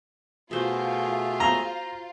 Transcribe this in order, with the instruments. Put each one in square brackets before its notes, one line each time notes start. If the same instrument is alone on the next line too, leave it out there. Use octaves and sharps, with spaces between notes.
[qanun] B2 C5 [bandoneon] A3 G#4 E5 [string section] F4
[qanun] C5 G#5 [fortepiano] A#5